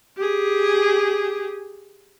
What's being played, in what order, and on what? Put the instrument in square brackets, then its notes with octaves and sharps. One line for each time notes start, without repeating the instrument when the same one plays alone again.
[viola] G4 G#4